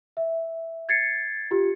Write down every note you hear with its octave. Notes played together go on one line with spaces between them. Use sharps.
E5
G#6 A6 C7 C#7
F4 G4